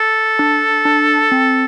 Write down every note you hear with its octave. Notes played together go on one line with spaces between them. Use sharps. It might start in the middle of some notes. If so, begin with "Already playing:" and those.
Already playing: A4
D4
D4
C4